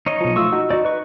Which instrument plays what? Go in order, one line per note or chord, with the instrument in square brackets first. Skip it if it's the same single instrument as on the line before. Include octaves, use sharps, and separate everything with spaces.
[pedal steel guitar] D#4 C#5 D#5
[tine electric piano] B1 F3
[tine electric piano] A3 F4 [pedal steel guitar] C#6 E6
[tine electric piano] D#4 F#4
[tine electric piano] D#4 [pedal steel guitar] F#4 D5
[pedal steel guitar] B4 C#6